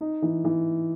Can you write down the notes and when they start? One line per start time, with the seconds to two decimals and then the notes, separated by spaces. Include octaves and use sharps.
0.01 D#4
0.22 E3
0.44 E3